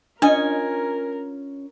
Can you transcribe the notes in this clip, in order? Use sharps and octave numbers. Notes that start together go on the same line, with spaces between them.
C#4 D4 F4 A#4 D#5 G#5